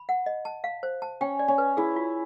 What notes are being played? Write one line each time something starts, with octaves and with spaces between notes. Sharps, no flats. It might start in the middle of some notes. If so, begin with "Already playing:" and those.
Already playing: B5
F#5
D#5
A5
F5
C5
A5
C#4 G5
D5
C#4
B4
E4 G#4
F4